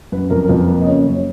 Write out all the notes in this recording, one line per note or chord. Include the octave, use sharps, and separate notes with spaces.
F#2 B4
F2 A#4
A#4
F2 B4
A#3 B4
D#5
C#3 C#5
F#2
C#5